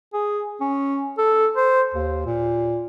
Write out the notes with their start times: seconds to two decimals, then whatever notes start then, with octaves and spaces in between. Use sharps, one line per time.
0.14 G#4
0.61 C#4
1.18 A4
1.56 C5
1.94 D#2
2.26 A#2